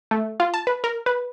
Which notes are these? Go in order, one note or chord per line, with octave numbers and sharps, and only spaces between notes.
A3
F4
A5
B4
A#4
B4